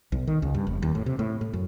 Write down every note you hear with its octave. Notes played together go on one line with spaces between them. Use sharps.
B1
D#3
C#2
G2
F1
D#2
A2
C3
A2
A2
F#2